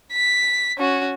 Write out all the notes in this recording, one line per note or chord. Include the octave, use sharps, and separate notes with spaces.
B6
C#4 F#4